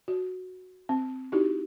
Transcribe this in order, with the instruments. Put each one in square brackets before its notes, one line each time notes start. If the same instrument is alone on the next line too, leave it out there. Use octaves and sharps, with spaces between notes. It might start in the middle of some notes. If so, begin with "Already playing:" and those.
[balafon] F#4
C4
D#4 E4 F#4 G4